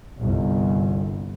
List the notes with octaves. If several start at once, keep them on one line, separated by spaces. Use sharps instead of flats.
G1 C2